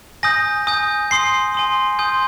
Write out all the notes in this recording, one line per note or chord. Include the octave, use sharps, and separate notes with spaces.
G#5 D#6 G6 A#6
G#5 D#6 G6
G#5 C6 D#6 C7
G#5 C6 D#6
G#5 C6 D#6 G6